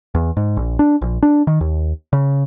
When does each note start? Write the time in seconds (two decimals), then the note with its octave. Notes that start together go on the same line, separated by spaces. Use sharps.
0.15 E2
0.37 G#2
0.57 A#1
0.79 D4
1.02 A#1
1.23 D4
1.47 D#3
1.61 D#2
2.13 C#3